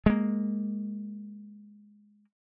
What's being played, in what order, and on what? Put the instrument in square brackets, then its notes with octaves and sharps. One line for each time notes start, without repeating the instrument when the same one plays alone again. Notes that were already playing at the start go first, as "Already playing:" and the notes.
[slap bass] G#3 A#3